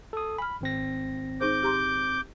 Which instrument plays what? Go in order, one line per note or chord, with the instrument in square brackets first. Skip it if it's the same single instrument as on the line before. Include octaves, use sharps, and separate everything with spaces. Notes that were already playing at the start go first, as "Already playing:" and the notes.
[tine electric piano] A4 D#6
[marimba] G#5 F6 [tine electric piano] B5
[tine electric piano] G#1 C4 A#6
[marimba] D#4 G#4 C5 [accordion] D6 G6
[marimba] G4 A#5 C6